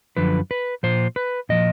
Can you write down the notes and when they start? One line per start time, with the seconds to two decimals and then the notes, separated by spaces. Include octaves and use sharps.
0.17 F#2 D3 F3 B4
0.51 B4
0.83 A#2 F3 C5
1.16 B4
1.49 A#2 F3 D#5